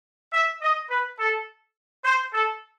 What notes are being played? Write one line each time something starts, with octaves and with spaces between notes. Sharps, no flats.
E5
D#5
B4
A4
C5
A4